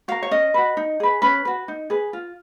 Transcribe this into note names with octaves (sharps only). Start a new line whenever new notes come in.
F#4 A#4 F5
C#5
C#4 D#5
F#4 B4
D#4
G#4 B4
C#4 B4
F#4 B4
D#4
G#4 B4
F4